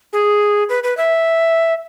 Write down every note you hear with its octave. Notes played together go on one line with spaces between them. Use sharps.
G#4
B4
B4
E5